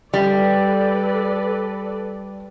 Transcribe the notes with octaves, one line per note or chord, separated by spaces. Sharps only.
G3 A4 B4 D5